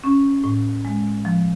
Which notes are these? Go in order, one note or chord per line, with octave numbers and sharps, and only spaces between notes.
C#4
A2
G#3
F3